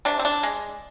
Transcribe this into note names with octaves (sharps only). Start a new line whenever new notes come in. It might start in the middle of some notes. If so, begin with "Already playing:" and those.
C3 D4
C4
D4
G#3